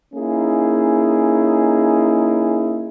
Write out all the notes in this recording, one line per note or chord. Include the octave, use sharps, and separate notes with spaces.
A#3 C#4 D#4 E4 G#4